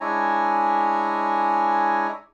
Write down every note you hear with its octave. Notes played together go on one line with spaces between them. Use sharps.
G#3 D4 E4 C#5 G#5 A#5